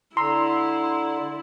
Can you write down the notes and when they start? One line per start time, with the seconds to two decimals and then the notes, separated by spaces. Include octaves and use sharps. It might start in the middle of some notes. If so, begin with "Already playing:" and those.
0.17 D3 E4 A#5 C6 E6